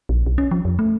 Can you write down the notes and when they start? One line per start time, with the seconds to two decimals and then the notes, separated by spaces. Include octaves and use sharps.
0.09 A#1
0.26 B1
0.38 C#4
0.51 F3
0.65 F2
0.79 A3